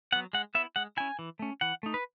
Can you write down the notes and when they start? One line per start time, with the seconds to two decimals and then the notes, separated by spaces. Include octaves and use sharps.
0.13 F#3 B3 F#5
0.33 G#3 F#5
0.55 B3 E4 E5
0.76 G#3 F#5
0.97 C#4 E4 G#5
1.19 E3
1.39 A3 C#4
1.61 E3 F#5
1.83 A3 D#4
1.94 B4